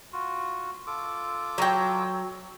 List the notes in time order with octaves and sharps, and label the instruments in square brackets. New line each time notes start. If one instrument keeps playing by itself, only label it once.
[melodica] F4 F#4
F4 A4 D6
[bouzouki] F#3 G5